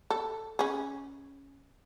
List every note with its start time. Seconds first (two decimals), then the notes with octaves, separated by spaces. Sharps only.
0.10 A4
0.59 C#4 G#4